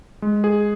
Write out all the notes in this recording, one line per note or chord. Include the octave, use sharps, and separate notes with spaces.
G#3
G#4